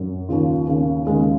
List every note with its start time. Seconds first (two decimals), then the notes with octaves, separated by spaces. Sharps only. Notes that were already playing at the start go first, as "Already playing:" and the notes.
Already playing: F#2
0.29 D#2 C#3 F4
0.67 D#2 C#3
1.07 D#2 C#3 G#3